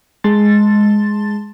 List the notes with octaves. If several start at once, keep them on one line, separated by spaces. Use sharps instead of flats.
G#3 A5 C6 A6